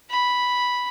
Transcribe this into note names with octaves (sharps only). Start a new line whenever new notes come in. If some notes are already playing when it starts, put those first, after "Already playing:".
B5